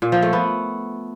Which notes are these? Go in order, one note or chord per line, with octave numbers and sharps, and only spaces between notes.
A#2
F3
A3
B3